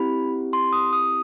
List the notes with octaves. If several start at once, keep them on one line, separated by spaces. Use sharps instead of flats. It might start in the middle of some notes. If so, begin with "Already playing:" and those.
Already playing: C4 E4 G4 B5
C6
D#6
D#6